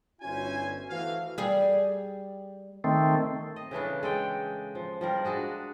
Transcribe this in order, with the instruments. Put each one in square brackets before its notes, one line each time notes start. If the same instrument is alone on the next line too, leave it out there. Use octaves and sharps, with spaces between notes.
[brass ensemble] G1 C#4 E4 F#4 C5 G#5
E3 A3 F#4 C5 F5
[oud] G3 G#4
[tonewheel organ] D#3 A3 C4
[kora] D#5
C#3 E3 A3 D4
G#3 A4 G5
F3
F3 G3 A#4
G#3 D4 F#4 G#4